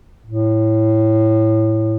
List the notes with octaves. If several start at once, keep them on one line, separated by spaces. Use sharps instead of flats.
A2